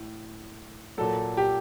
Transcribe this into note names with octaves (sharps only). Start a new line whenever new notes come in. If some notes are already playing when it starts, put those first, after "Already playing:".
Already playing: A2
A#2 F#3 A4
G4